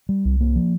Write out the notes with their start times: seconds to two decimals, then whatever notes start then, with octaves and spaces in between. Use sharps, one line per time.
0.09 G3
0.25 C2
0.41 A#3
0.56 F3